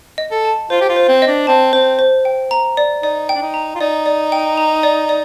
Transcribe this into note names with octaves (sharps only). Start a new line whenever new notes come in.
D#5
A4
A5
F4 C5
G4
F4
C5
C4
D#5
D4
C4 A5
C4 C5
C5
G5
A#5
D5
D#4 D5
G5
D4
D#4
A#5
F4
D#4 D5
D5
G5
A#5
D5
D5